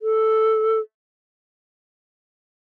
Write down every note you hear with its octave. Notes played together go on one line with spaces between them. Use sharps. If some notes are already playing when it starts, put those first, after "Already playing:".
A4